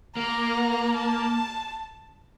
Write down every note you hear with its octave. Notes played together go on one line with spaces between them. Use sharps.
A#3 A#5
A5